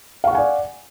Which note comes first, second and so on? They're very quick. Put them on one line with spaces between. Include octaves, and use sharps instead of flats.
F5 C#6 F#5 G#5 D5